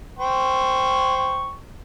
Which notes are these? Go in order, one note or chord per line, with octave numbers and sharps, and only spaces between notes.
C5 G5 C#6